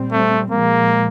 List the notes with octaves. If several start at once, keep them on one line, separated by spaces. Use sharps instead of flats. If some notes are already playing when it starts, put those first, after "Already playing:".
Already playing: A#2 G3 C4
A3
A#2 F3 G#3 A#3